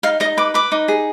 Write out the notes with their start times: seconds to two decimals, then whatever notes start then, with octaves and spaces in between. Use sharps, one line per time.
0.03 D#4 F5
0.20 D#4 D#5
0.37 B4 D6
0.54 B4 D6
0.72 D#4
0.88 G#4